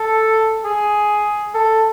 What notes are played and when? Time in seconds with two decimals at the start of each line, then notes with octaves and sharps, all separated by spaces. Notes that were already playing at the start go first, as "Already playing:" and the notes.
Already playing: A4
0.64 G#4
1.55 A4